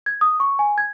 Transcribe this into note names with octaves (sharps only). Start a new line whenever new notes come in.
G#6
D#6
C#6
G#5
G#6